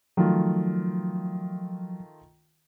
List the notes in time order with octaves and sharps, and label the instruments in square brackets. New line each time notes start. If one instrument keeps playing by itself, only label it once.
[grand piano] D#3 A3 F4 [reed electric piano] F3 F#3